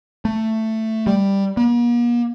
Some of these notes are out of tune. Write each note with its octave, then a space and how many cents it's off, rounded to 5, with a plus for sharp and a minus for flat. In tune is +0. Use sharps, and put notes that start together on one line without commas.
A3 +10
G3 +5
A#3 +45